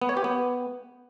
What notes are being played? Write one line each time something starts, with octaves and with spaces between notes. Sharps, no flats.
B3
C#5
G4
B3